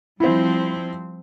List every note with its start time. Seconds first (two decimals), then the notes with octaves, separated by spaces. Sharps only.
0.20 F3 G3 C4 E4 C5